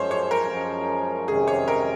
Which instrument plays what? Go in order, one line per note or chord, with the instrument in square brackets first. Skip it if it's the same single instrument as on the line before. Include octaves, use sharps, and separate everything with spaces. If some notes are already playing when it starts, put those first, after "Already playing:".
Already playing: [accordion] F#2 F3 G#3 C#4 [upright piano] C5 C#5
[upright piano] C#5
A#4
[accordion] F#2 F3 G#3 C#4
[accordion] F2 C3 D#3 G#3 C#4 [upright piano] G#4
[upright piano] C#5
A#4